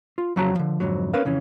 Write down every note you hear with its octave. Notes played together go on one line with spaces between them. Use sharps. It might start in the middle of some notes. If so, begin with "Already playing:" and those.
F4
F2 C#3 F#3 F#4 A5 A#5
D3 F3
F2 G#2 D3 F#3
C#4 A#4 B4 F5
F2 C#3 E3 C#4